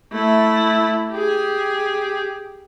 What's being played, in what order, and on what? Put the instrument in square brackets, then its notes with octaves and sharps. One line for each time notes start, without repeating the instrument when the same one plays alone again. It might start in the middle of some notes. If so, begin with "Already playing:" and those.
[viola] A3 E4
G4 G#4